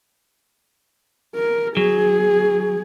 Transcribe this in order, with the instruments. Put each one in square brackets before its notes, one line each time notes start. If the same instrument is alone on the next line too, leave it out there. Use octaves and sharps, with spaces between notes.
[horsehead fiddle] A#4
[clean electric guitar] F#3 [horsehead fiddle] G#4